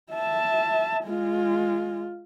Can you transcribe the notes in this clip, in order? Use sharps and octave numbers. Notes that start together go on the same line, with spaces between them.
E5 A5
G#3 F4